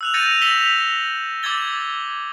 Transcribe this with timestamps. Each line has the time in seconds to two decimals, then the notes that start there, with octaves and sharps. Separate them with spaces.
0.01 E6 F#6 F7
0.14 G6 A6 A#6 C#7 D#7 F7
0.42 E6 A#6 B6 E7 F7 G7
1.43 D6 E6 G#6 A6 G7